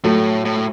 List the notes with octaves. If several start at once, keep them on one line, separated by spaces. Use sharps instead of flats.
A2 F#3 A3
A2